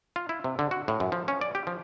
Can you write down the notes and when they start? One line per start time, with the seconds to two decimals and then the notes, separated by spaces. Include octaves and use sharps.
0.16 F4
0.29 E4
0.44 C3
0.59 D3
0.71 F#4
0.88 A2
1.00 F#2
1.12 F3
1.28 C#4
1.41 D5
1.55 G4
1.67 F3